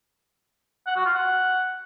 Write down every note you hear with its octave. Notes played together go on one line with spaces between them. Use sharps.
F#5
F#4
F4
F#5